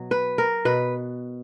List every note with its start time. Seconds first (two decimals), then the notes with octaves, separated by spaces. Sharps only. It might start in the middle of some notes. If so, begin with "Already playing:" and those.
Already playing: B2 F#3
0.11 B4
0.38 A#4
0.65 B2 B4